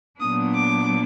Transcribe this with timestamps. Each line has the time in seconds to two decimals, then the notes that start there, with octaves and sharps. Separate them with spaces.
0.20 A#2 F#3 B3 D4 D#6
0.54 D6